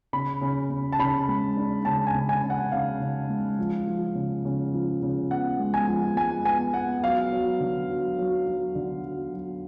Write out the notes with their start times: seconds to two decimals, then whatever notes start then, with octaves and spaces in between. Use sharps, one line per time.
0.13 C#3 B5
0.41 C#3
0.70 C#3
0.92 A5
0.99 C#3 B5
1.28 G#3
1.57 D4
1.85 C#3 A5
2.07 G#5
2.15 C#3
2.29 G#5
2.43 C#3
2.50 F#5
2.72 C#3 F5
3.00 C#3
3.29 G#3
3.58 F3
3.87 F3
4.15 C#3
4.45 C#3
4.73 F3
5.02 C#3
5.31 B3 F#5
5.59 G#3
5.74 G#5
5.87 F3
6.16 G#3 G#5
6.45 B3 G#5
6.74 B3 F#5
7.03 F#3 F5
7.32 F#3
7.60 D3
7.90 F#3
8.19 F#3
8.47 F#3
8.75 D3
9.05 F#3
9.33 F#3